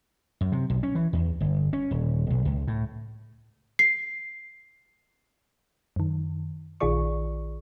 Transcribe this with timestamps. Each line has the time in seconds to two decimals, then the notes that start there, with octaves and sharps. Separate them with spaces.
0.41 F#2
0.52 C3
0.70 B1
0.83 C#4
0.95 E3
1.13 E2
1.41 G1
1.73 C#4
1.91 D#1
2.30 B1
2.45 C#2
2.68 A2
3.79 C7
5.96 F#2 D#3
6.80 A#1 D#3 F4 G#4 D5 C#6